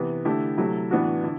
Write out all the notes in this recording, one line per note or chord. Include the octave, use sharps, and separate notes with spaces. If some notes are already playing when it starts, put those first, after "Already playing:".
Already playing: C3 E3 B3
D3 A3 E4 G4
C3 F#3 A3 E4
A2 E3 B3 D4 F#4
D3 E4